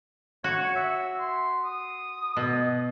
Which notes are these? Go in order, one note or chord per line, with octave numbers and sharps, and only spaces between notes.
F#4 C#5
E5
C6
D#6
B2